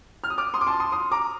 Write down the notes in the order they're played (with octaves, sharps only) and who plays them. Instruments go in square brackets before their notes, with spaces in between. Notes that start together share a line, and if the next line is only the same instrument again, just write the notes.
[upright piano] F6
D#6
D6 F6
C6 D#6
D6
A5 C6
C6 D#6
C6 D#6
A#5 D6